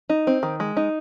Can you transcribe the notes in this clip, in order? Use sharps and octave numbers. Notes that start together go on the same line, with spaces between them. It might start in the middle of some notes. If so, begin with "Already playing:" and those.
D#4
C4
D#3
G#3
D#4